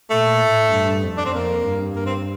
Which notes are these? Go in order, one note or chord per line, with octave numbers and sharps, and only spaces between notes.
A#2 A3
A2
G2
F2
D4
C4
F2 A#3
G2
A#3
C4